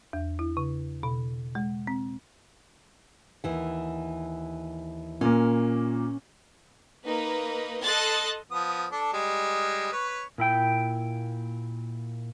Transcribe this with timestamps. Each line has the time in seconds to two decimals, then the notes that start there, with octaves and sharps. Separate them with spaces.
0.13 E2
0.39 E4
0.57 C#3
1.03 B2
1.55 G#3
1.87 C4
3.44 D#2 E3 F#5
5.21 A#2 A#3 C#4
7.05 A#3 D#4 B4
7.83 A4 D#5 C6 F#6 A6
8.51 F3 B3 D#6
8.92 D4 A4
9.13 G3 G#3
9.92 B4 C#5
10.38 A#2 E4 G5